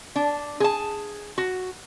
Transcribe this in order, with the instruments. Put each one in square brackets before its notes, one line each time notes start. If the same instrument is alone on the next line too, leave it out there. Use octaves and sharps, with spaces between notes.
[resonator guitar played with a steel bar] D4
G#4 A5
F#4